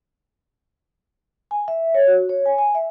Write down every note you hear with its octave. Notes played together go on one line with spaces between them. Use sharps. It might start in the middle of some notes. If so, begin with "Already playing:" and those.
G#5
E5
C#5
F#4
C#5
G#5
G#5
E5